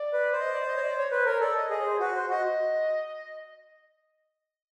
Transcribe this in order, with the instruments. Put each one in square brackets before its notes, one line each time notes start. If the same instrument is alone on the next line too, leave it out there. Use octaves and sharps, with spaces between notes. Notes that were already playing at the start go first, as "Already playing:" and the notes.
Already playing: [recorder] D5
[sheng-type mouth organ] B4
C5
[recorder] D#5
D5
D#5
C#5
D5
C#5
[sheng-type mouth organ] B4 [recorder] C5
[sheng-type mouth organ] A#4 [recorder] C#5
[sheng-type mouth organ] A4 [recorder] D5
[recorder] D#5
[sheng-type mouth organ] G#4 [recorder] D#5
[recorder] C#5
C5
[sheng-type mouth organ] F#4 [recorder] B4
[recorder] C5
[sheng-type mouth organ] F#4 [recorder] D#5